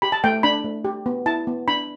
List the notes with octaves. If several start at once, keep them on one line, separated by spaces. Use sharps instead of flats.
G4 B5
A5
A3 G5
D4 B5
A3
G4
B3
E4 A5
B3
D4 B5